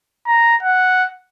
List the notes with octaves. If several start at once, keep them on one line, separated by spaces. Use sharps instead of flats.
A#5
F#5